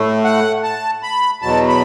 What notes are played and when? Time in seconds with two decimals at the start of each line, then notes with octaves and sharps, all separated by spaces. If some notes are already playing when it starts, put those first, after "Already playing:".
Already playing: A2 A3
0.25 F#5
0.63 A5
1.03 B5
1.42 E2 B2 F#3 A5
1.68 B5